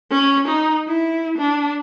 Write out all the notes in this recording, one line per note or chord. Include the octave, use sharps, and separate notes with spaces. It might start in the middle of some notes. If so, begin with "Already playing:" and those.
C#4
D#4
E4
D4